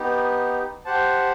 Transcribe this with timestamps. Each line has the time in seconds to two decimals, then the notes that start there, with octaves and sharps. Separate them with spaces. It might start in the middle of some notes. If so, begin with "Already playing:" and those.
Already playing: B3 D#4 G4
0.85 G4 C5 F#5 A5